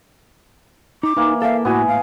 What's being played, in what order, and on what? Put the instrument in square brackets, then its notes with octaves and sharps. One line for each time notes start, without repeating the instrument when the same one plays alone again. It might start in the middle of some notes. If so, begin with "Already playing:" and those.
[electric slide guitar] D#4 [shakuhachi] D6
[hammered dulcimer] E3 A#3 [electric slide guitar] D#4
[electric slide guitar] A4 A#4 E5 [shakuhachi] F5
[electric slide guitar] A2 E4 [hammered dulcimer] B3 G#5 [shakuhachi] F#4
[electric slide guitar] A2 [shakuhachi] F5